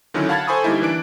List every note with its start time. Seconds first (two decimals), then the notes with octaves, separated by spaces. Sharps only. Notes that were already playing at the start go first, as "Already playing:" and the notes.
0.14 D3 D#3 F#3 C#4 E4
0.29 F5 F#5 A5 B5 G#6 A6
0.47 A4 C5 G#5 B5 C#6 D#6
0.64 D3 G3 A#3 D#4 E4
0.82 E3 D4 D7